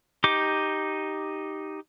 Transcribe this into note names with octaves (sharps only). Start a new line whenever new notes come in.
D#4 G4 D6